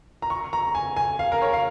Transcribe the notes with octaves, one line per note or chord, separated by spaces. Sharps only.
A#5
C#6
A#5
G#5
G#5
F5
A#4
C#5
F5